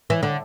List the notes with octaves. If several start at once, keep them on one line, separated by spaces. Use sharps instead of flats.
E3
D3